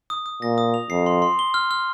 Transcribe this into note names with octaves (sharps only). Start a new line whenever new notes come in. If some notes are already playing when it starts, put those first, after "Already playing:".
D#6
D#6
A#2 A#6
D#6
F7
F2 C7
C6
C6
G7
F6
F6